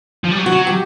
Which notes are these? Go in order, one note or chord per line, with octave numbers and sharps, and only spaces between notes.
F3
G3
F#3
F#4
F#3
G4